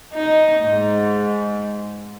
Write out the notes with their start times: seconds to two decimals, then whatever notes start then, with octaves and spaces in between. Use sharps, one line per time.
0.14 D#4
0.64 G#2